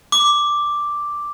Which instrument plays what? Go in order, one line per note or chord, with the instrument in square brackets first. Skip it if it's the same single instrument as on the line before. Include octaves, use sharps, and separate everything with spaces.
[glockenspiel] D6